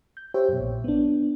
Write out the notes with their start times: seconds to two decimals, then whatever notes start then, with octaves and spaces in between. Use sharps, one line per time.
0.17 G6
0.34 G4 C5 C#5 E5 G5
0.49 F#2 B2
0.60 A#1 A#2
0.84 B3 D4